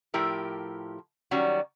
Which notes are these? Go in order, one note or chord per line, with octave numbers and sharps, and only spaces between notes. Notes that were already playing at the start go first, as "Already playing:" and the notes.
A2 F3 E4 G4 A#4
D#3 F#3 G3 C#4 F#4